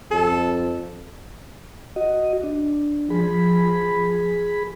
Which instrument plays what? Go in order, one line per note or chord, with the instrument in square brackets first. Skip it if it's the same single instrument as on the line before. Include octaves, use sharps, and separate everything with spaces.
[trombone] F2 [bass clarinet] A4
[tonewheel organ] F#4 D#5
D4
[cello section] F3 [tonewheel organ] G#4 B5